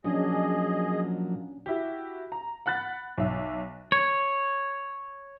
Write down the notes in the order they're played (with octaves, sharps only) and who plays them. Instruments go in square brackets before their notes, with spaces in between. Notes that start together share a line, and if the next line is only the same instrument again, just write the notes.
[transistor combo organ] A#2 F3 F#3 [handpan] C#4 D4 [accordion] G#4 D#5
[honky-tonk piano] E4 F#4 G4
A#5
F#5 B5 F#6 A6
B1 E5
[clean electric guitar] C#5